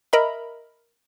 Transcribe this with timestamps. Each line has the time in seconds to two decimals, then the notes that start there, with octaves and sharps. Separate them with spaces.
0.13 A#4 D#5 E5 A#5 B5